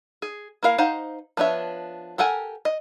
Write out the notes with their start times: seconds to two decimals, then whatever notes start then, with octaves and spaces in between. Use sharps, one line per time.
0.22 G#4
0.63 A#3 E4 A#4 F5
0.78 D#4 C5 F5 F#5
1.37 F3 B3 D4 C#5 E5
2.18 G4 A4 A#4 F#5 G#5
2.65 D#5